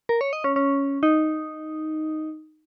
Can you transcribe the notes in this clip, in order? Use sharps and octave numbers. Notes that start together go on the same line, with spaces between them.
A#4
C#5
D#5
C#4
C#4
D#4